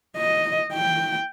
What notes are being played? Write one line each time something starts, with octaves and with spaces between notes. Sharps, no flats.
D#5
G5